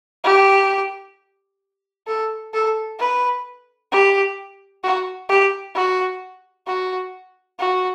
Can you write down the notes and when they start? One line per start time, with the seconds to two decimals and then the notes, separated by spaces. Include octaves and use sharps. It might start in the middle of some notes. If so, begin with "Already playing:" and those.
0.24 G4
2.07 A4
2.54 A4
2.99 B4
3.92 G4
4.84 F#4
5.29 G4
5.75 F#4
6.67 F#4
7.59 F#4